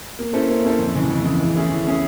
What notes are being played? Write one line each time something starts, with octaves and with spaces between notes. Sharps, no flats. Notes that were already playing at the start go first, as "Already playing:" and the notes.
A#3
C#4 E4 A4 C5
A#3
C#4 E4 A4 C5
F2
C#3 E3 G#3
F2
C#3 E3 G#3
E3
A3 C#4 E4 G#4
E3
A3 C#4 E4 G#4